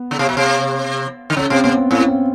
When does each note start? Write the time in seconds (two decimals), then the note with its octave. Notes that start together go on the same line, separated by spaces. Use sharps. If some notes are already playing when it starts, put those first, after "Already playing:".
Already playing: B3
0.11 C#3
0.19 C3
0.29 B2
0.37 C3
1.30 D3
1.37 C#3 C#4
1.50 C3 C4
1.64 C3 B3
1.77 C4
1.91 A2 C#4
2.01 C#4
2.08 C4